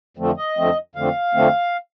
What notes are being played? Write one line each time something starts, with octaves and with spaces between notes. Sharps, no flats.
F2 D3 F3 A3 C4
D#5
F2 D3 F3 A3 C4
F2 D3 F3 A3 C4 F5
F2 D3 F3 A3 C4